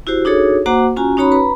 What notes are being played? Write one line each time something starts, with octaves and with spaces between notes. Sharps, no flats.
E4 F#4 G4 C5
D4 D#4 F#4 G#4 A4 C#5
A#3 F#4 C5 F#5 A#5 D6
C#4 F4 F#4 G#5 A#5
C#4 D#4 F#4 C#5 A#5 B5
B4 A#5 B5